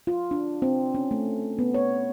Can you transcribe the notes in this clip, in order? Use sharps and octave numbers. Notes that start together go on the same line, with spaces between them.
F4
D4
C4
C#4
A3
B3
C#5